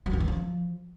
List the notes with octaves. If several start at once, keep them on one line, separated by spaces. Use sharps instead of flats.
F#3
G2
E3
F3